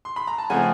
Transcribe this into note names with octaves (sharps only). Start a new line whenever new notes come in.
C6
B5
A#5
A5
C#3 F3 A3 C4 F#5 G#5